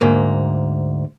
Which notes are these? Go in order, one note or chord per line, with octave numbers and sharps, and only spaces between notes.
D2 G#2 A#3